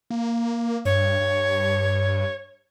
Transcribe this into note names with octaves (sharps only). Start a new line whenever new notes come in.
A#3
G2 C#5
G2